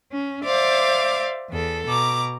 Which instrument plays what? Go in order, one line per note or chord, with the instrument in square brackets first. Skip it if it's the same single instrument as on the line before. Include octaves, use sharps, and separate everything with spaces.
[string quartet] C#4
C5 D5 E5 F5 D6
E2 A4
B2 A#5 D6